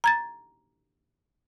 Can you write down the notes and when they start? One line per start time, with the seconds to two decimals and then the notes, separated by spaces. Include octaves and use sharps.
0.04 A#5 G#6 A6